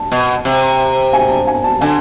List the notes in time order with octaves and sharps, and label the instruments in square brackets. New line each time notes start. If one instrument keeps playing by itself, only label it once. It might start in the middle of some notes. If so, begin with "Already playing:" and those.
Already playing: [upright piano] A5
[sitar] B2
C3
[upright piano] G#5
A5
G#5
A5
[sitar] D3 [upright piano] G#5